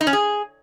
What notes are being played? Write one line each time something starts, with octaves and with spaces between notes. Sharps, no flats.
D#4
C#4
G#4